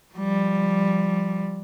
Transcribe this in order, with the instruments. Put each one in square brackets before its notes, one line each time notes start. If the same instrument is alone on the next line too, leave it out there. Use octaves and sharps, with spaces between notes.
[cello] F3 G3